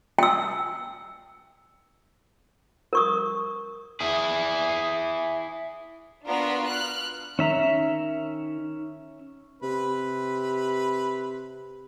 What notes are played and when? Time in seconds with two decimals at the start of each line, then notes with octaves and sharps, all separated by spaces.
0.19 G5 E6
2.93 A#4 C#6 D#6
4.00 E4 G#4
6.26 B3 D4 F4 F#4 A#4 B5
6.67 F6 F#6
7.39 D#3 C#4 E5 A#5
9.63 C3 B4